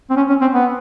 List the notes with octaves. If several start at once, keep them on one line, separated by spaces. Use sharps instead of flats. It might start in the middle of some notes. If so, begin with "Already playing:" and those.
C4
C#4
C#4
C4
B3